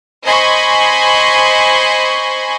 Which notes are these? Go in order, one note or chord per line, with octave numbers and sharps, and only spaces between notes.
C5 D#5 G#5 B5 C#6